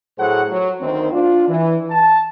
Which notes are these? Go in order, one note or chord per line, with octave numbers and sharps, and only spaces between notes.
A2 F#3 G#4 A4 C5 F#5
F#3
D2 D#3 C4
D4 F4
E3
A5